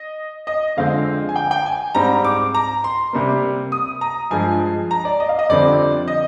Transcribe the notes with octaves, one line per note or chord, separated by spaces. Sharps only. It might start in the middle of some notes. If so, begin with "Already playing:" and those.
Already playing: D#5
D#5
F2 D3 G#3 C4 F5
G#5
G5
G5
G#5
G#2 G3 C4 A#5
D6
A#5
C6
C3 G3 A#3
D#6
A#5
G2 F3 G#3 G#5
A#5
D5
D#5
F5
D#5
F2 D3 G3 C4 D5
D#5